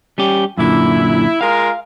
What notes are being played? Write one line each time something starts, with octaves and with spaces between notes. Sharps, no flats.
G3 C#4 G4
F#2 A#2 D3 E4
G#3 F4 A#4 F5